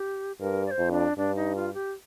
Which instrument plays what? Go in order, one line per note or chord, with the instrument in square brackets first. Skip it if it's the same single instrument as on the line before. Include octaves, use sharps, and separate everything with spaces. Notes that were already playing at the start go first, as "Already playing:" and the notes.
Already playing: [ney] G4
[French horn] G2 [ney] A#4
[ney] D5
C5
[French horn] F2
[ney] D4
[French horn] G2 [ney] D4
[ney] D#4
F4
G4